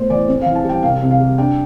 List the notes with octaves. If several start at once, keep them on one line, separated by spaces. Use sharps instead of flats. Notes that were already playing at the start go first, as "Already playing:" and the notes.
Already playing: A2 B3 C5
E3 D5
C4
F5
E3
A5
G3
G5
C2 F5
C3
F5
G3
D4 G5